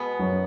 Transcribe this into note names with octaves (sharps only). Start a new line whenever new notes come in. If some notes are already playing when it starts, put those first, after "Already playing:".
Already playing: B2 G#3 B3
F#2 F#3